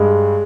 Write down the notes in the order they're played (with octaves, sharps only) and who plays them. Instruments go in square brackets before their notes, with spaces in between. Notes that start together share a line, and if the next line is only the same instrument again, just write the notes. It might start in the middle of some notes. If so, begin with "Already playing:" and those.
Already playing: [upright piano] G2 G#3